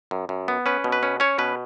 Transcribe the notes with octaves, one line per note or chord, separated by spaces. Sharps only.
F#2
F#2
B3
C#4 B4
B2
B4
C#4
C#4 C#5
B2 B4